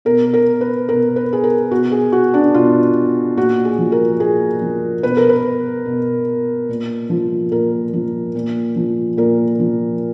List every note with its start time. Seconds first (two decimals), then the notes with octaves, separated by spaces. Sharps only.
0.05 B2 A#4
0.34 A#4
0.61 B4
0.89 B2 A#4
1.16 B4
1.33 G#4
1.44 A#4
1.71 B2 F#4
1.92 G#4
2.12 F#4
2.34 D4
2.54 B2 F4
3.37 A#2 F#4
3.65 G#4
3.78 F3
3.92 A#4
4.20 A#2 G#4
4.62 F3
5.03 B2 B4
5.17 A#4
5.29 B4
5.86 B2
6.69 A#2
7.10 F3
7.52 A#2 A#4
7.93 F3
8.35 A#2
8.76 F3
9.17 A#2 A#4
9.59 F3